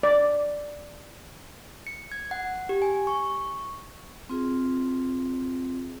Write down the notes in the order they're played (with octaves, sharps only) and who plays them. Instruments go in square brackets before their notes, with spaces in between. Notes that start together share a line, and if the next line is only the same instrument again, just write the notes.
[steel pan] D5
[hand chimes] C#7
G#6
F#5
G4
G#5
C#6
[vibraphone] C4 F4 G#4